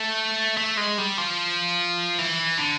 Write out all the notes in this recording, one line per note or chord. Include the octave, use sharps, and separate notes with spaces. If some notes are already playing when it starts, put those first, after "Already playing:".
Already playing: A3
A3
G#3
G3
F3
E3
D3